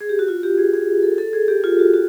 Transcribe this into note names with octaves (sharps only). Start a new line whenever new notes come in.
G#4
G4
F#4
F4
G4
G#4
G#4
A4
A4
G#4
G4
F4
F#4
F#4